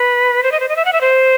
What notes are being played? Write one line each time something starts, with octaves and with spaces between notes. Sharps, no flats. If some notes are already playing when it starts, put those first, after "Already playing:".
Already playing: B4
C5
D#5
C5
D#5
E5
F#5
E5
C5